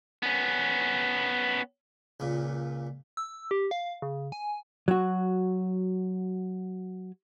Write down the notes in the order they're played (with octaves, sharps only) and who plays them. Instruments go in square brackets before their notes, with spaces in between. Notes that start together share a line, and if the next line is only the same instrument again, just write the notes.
[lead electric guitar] B3 C#4
[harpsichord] C#2 A#2
[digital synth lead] E6
G4
F5
C#3
G#5
[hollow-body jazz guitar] F#3 F#4